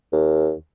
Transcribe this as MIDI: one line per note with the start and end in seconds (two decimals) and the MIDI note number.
0.13 0.53 39